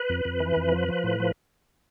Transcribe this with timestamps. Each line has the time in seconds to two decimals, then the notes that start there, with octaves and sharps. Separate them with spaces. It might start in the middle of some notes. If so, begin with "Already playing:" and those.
Already playing: B4
0.09 F2
0.25 F2
0.40 E3
0.56 F2
0.72 F3
0.88 F3
1.04 A2
1.20 F3